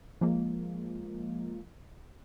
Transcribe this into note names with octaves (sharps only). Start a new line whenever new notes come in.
F3 G#3 A#3